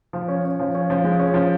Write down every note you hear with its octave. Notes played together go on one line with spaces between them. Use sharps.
F3
C#4
C#4
F3
C#4
F3
G#3
C#4
F3